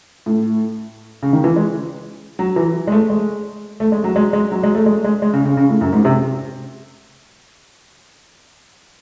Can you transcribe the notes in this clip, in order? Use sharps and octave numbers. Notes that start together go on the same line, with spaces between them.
A2
C#3
D#3
E3
G#3
F#3
E3
G#3
A3
G#3
A3
G#3
F#3
G#3
G#3
F#3
G#3
A3
G#3
G#3
G#3
C#3
C#3
C#3
A2
F#2
G#2
C3